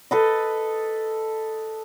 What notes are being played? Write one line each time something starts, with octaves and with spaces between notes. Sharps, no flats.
A4 B4 D#5